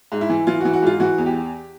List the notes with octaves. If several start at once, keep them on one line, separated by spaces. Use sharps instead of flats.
G#2
E4
E3
E3 F4
F#4
E3
F#4
G#2 F4
E3 F#4
E2
G4